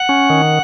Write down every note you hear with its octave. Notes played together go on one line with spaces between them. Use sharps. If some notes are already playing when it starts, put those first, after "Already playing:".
Already playing: F#5
C#4
D#3